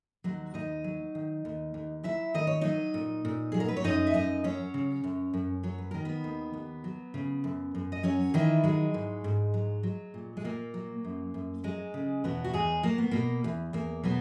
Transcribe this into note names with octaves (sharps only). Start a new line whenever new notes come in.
D#2 F#3 F#4
D#2 D#4 D#5
F#3
D#3
D#2
D#2
F#3 E4 E5
D#3 D#5
C#5
F#3 D#4 D#5
A#2
A#2
F#3 G#4
A#4
B4
C#5
F#2 D#4 D#5
E5
F#2 D#4 D#5
F#3 C#4 C#5
C#3
F#2
F#2
F#3 C#5
B4
D#3 A#4
B3 B4
D#2
D#2
F#3
C#3
F#2
F#2
D#5
F#3 C#4 C#5
D#3 E3 E4
F#3 G#3
G#2
G#2
F#3
F#3
A#2
G#3
A#2 A#3
F#3
F#2
F#2
F#3 G#3
C#3
E2 B2 B3
F#4
E2 G#3 G#4
F#3 A#3
B3
B2 A#3
E2
E2 A#3
B2 F#3 B3